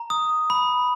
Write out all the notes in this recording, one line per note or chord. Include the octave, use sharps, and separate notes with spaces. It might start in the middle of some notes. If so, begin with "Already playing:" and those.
Already playing: A#5
D#6
B5